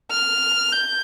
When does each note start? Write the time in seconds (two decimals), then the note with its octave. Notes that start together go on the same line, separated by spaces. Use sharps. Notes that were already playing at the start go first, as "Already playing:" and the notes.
0.11 F6
0.72 G6